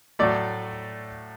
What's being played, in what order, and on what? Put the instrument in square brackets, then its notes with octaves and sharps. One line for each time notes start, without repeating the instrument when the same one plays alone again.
[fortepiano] A2 F#3 A3 D5